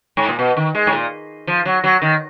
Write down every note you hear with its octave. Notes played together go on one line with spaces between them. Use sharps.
G#2
A#2
B2
D#3
G#3
G#2
A#2
F3
F#3
F#3
D#3